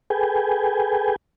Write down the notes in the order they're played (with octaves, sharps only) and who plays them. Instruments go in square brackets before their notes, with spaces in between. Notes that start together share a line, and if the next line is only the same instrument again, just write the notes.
[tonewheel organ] G#4 A4 B4 G5 G#5